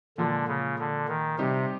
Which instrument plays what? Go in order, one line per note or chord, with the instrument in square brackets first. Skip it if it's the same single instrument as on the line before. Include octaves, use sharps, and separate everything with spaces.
[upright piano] A#2 F3 G#3 [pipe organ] D3
[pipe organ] C#3
D3
D#3
[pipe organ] C3 [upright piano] G3 C4 D#4 G4